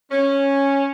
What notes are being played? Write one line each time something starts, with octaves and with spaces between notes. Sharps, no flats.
C#4